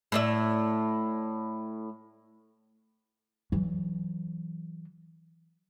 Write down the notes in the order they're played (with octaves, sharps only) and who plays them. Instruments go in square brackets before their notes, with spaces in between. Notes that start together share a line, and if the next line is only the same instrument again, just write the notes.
[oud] A2 D5 E5
[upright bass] E3 F#3